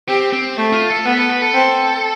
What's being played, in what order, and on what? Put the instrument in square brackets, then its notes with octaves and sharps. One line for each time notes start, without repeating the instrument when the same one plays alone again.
[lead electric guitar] C4 [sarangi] G4
[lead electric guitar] C4
[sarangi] A3
[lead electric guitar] F4
A4
[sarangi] B3 [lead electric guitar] B4
[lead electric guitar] A4
B4
A4
[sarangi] C4